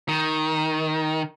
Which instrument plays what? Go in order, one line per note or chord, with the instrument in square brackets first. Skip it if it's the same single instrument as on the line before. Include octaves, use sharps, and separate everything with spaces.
[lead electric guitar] D#3